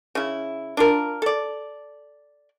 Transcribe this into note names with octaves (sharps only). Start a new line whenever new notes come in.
C#3 E4
D4 F4 A#4
A4 D5